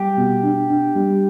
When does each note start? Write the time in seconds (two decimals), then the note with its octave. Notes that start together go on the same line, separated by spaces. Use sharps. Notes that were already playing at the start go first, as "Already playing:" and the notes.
Already playing: G3 G4
0.17 B2
0.43 D4
0.69 D4
0.95 G3